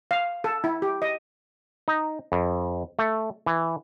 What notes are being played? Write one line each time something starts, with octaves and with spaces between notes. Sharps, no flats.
F5
A4
E4
G4
D#5
D#4
F2
A3
E3